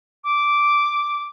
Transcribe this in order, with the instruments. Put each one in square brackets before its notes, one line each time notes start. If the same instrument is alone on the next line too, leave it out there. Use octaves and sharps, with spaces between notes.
[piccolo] D6